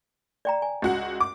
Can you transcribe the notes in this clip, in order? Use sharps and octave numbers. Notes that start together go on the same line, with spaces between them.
D5 G5 A#5
G#5
C#2 F#4 F#5
D6